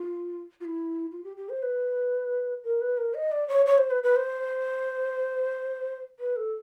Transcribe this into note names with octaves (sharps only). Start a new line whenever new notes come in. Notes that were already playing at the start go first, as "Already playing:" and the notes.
Already playing: F4
F4
E4
F4
G4
G4
C5
B4
A#4
B4
A#4
D#5
D5
C#5
C#5
C5
B4
B4
C5
B4
A4